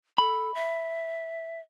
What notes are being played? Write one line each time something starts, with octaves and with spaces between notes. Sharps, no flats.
A4 B5
E5